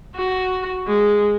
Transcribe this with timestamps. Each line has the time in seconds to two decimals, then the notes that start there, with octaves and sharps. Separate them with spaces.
0.15 F#4
0.87 G#3